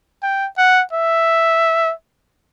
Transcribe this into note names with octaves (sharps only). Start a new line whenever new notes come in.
G5
F#5
E5